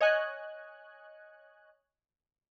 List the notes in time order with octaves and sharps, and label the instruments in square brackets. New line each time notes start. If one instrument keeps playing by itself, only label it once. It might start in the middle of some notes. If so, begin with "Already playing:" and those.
[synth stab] C#5 D#5 G#5 F#6